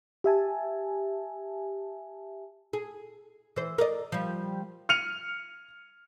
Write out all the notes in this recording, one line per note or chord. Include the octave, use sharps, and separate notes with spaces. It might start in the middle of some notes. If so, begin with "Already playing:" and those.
G4 E5 G#5 A5
G#4
E3 C5
A#4 D5 D#5
F3 G3
F6 C#7 D#7 F7